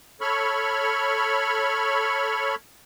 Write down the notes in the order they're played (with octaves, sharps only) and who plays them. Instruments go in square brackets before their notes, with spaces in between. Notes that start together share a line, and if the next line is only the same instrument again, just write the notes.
[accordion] A4 C#5 B5 C#6 F6